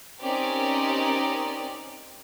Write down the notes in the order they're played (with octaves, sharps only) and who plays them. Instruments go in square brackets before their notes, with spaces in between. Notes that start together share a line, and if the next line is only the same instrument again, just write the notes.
[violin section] C4 C#4 D#4 G4 A#4 D5